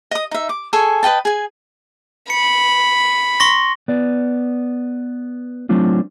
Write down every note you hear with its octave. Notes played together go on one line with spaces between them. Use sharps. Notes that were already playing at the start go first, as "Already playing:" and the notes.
D#5 D#6
D#4 E5
D6
G#4 A4 G#5 C#6
B4 D#5 G5 A5
G#4 G#5
B5 C#7
C6 C#6 A#6
B3 D5
F#3 A3 C4 D4 F4